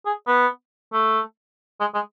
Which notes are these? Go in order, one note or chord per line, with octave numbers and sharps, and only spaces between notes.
G#4
B3
A3
G#3
G#3